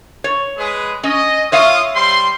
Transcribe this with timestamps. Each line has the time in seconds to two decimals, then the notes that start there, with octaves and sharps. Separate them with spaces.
0.24 C#5
0.57 G#3 G#4 B4
1.03 C#4 D#5
1.52 F4 C#5 E5 F5 D#6
1.96 G3 C5 C6